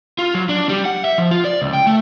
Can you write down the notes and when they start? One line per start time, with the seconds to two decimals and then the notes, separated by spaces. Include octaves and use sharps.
0.19 F4
0.35 F#3
0.49 D4
0.69 G3
0.85 F#5
1.05 E5
1.18 F3
1.31 F4
1.45 D5
1.62 C#2
1.73 G5
1.87 A3